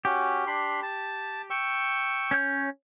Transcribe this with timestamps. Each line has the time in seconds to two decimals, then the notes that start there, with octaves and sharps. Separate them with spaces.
0.05 C#4 F#4 G4
0.47 D4 B5 C6
0.83 A5
1.50 G5 C#6 E6
2.31 C#4 C#5 G6